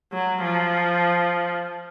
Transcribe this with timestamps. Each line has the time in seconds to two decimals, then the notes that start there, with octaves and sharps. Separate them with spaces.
0.13 F#3
0.43 F3